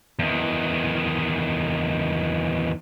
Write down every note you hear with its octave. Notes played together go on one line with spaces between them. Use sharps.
E2 D#3